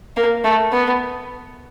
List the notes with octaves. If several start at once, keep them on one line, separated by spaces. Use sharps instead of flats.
A#3
A3
B3